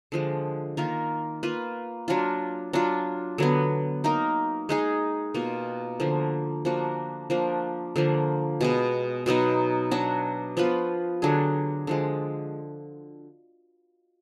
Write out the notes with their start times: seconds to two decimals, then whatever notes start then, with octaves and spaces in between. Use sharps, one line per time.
0.12 D3 F3 G#3
0.77 D#3 A#3 F4 A#4
1.43 A#3 F4 B4
2.08 F#3 D4 F4
2.73 F#3 D4 F4
3.38 D3 F#3 B3
4.04 A#3 D#4 A#4
4.69 G#3 D#4 G#4
5.34 B2 A#3 F4
6.00 D3 F3 A#3
6.65 F3 A#3 D4 F#4
7.30 F3 A#3 D4
7.96 D3 F3 A#3
8.61 B2 G#3 B3
9.26 B2 F#3 B3 D#4
9.91 F#3 D4 F#4
10.57 F3 B3 F4 B4
11.22 D3 F#3 D4 G#4
11.87 D3 F3 G#3